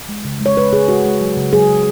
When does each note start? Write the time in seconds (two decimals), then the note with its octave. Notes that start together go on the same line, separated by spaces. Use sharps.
0.09 G#3
0.25 C#3
0.40 G#3
0.46 C#5
0.57 G#3 B4
0.73 C#3 G#4
0.88 G#3 F#4
1.05 G#3
1.21 F#3
1.36 C#3
1.53 F#3 G#4
1.69 C#3